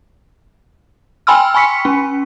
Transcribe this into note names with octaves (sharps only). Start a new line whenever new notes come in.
G5 G#5 B5 C6 E6 F6
G#5 B5 C#6 B6 C#7
C#4